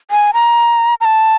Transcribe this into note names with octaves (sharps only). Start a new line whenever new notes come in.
G#5
A#5
A#5
A5